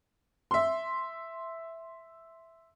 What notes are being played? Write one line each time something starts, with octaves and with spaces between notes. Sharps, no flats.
E5 C6